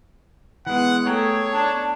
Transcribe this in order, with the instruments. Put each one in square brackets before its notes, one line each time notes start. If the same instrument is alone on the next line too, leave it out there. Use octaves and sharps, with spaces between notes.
[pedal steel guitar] E3 G#3 [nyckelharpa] B3 [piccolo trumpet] F#5
[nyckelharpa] A3 [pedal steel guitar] G#4 G5 A#5 [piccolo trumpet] C#5
[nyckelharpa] D4 [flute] A5